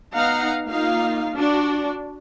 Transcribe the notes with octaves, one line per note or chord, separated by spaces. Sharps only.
B3 D#4 F5 F#5 A#5
A#3 D#4 F4 F5
D4 F#4